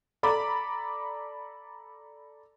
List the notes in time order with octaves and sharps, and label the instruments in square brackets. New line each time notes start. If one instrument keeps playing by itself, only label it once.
[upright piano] A4 D5 A#5 B5 D6